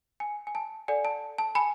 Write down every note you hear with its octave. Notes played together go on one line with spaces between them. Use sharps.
G#5
G#5
A5
A4 D5 F#5 G#5
A5
A5
G#5 B5